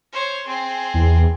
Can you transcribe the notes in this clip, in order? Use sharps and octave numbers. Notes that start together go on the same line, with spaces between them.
C5 C#5
C4 G#4
E2